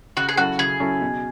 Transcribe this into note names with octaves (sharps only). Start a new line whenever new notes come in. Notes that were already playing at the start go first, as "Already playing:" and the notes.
C#3 F#4
G#4
F#3 C#4 E4 F#4 A4
C#3 G#4
F#3 C#4 E4 A4
B2